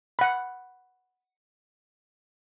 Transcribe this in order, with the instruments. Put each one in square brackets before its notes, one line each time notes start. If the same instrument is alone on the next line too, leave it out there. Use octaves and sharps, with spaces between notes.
[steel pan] F#5 B5